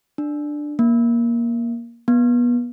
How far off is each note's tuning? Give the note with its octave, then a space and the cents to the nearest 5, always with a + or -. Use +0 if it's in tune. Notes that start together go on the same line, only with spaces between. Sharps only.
D4 +10
A#3 +15
B3 -30